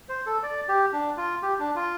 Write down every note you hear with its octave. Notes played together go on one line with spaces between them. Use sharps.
C5
A4
D5
G4
D4
F4
G4
D4
F4